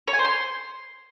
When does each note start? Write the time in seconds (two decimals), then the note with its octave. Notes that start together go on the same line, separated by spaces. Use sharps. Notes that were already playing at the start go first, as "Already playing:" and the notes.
0.08 C#5
0.13 G#5
0.19 C5
0.25 C6